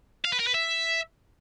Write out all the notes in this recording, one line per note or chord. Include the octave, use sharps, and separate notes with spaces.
F5
B4
A#4
B4
E5